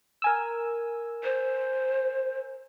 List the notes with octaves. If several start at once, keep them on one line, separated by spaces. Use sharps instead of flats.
A#4 G#5 E6
C5